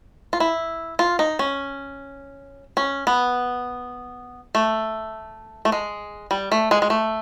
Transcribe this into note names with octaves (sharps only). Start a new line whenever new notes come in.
F4
E4
F4
D#4
C#4
C#4
B3
A3
A3
G#3
G3
A3
G#3
G#3
A3